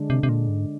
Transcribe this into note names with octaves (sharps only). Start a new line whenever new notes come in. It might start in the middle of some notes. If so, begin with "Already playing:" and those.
Already playing: D3 G#3 D4
C3
C3
A#2
G#2